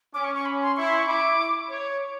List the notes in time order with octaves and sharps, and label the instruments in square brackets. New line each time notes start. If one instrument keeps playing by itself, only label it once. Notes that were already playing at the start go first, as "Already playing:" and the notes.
[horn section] C#4 [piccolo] D6
[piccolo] C#6
C#6
B5
C6
[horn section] E4 [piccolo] C#6
[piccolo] C6
C#6
[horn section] E4 [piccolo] D6
[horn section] C#5